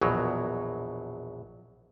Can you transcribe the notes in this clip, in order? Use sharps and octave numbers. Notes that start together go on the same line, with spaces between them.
A#1 E2 B2 F#3